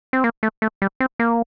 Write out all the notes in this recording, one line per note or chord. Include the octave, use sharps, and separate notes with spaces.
C4
A#3
A3
A3
G3
C4
A#3